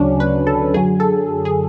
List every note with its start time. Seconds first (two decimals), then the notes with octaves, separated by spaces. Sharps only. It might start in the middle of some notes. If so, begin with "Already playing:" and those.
Already playing: D2 C#3 F#3 C#4 D4
0.20 B4
0.47 A4
0.74 F#2 D3 F#3 G#4
1.00 A4
1.45 G#4